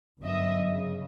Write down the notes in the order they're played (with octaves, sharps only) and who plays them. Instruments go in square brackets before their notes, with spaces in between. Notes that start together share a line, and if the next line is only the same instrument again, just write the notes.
[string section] G1 F#2 D#5 E5
C#3